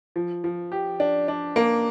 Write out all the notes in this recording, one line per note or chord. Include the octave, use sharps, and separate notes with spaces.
F3
F3
G4
D4
D4
A#3